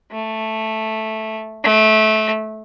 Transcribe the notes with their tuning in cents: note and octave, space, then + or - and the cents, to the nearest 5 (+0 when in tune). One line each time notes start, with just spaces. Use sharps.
A3 +0
A3 -20